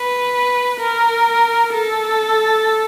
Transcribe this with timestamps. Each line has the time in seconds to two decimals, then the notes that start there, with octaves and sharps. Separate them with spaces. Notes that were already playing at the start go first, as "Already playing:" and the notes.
Already playing: B4
0.80 A#4
1.73 A4